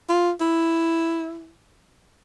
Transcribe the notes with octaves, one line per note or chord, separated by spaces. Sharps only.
F4
E4